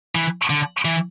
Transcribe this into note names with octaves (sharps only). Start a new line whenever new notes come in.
E3
D3
E3